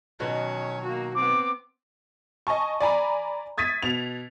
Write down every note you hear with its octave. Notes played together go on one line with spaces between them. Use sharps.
B2 D#3 F#3 C#4 C#5
A#3 F#4
B3 C4 D6
D#5 G#5 A5 C#6
D5 G#5 A#5 B5
D#6 G#6 A6 B6 D#7
B2 F7